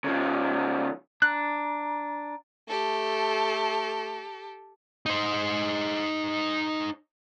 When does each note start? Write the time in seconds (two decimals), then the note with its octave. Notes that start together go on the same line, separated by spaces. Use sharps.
0.04 C#3 F3
1.22 D4 A#5 F#6
2.69 A3 G4 A4
5.06 D#4 C5